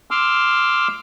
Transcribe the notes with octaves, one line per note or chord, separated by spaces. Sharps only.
C6 D6 E6 F6